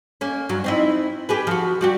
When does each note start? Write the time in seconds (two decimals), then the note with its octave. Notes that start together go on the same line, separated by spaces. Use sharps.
0.21 A#3 C#4
0.49 G2 F#3
0.64 C4 D#4 E4
1.29 G4 G#4 B4
1.47 F3 F#4
1.81 G3 F#4 G4